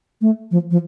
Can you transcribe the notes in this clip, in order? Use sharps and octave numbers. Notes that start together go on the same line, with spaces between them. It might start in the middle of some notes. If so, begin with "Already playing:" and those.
A3
F3
F3